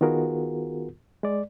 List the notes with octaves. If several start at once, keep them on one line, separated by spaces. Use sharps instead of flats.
D#3 B3 F4 F#4 G#4 A#4
G#3 D5